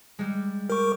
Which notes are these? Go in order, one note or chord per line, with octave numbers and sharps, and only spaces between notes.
G3 G#3
G4 A#4 C#6